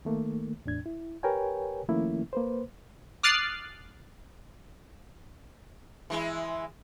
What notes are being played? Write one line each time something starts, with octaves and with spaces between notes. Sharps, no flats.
D#3 A3 A#3
E2 A2 D4 G#6
E4
G4 A#4 B4 C#5 G5 G#5
D#3 F3 A3 A#3 C#4 E4
A#3 B4 C5
D6 D#6 F6 F#6 A6 C7
E3 G#3 E4